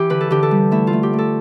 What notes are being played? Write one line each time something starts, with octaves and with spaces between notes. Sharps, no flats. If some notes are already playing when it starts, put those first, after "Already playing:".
Already playing: E3 G4
D3 B4
A4
D3 G4
A4
G3
A3 E4
F4
A3
G4
A3
A4